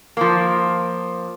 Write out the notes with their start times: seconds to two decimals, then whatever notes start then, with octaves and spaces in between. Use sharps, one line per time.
0.17 F3 A#3